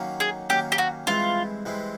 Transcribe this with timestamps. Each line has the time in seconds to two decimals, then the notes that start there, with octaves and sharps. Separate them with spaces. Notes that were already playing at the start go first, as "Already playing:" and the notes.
Already playing: D#3 F#3 A#3 C#4
0.20 G#4
0.49 D#3 F#3 A#3 C#4 G4
0.72 G4
0.78 F#4
1.07 G2 E3 G#3 C4 E4 F4
1.65 G2 E3 G#3 C4 E4